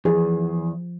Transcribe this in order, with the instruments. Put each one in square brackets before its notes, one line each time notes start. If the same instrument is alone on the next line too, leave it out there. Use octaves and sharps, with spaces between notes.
[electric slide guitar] E2 [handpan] F3 [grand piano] G#4